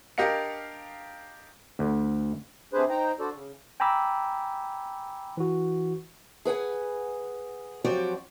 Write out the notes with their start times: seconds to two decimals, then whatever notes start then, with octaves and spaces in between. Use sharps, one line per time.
0.18 D4 G4 A#4 D#5 F5 C#7
1.79 D2
2.73 C3 D4 G#4 B4 C5
2.89 D#4 C5 G5 A#5
3.20 D4 F#4 A4 C5 D5
3.33 C#3
3.80 G5 G#5 A#5 B5 D6 E6
5.37 E3 F#4
6.45 G#4 B4 F#5 G#5
7.84 F3 F#3 C4 F#4 G4 D5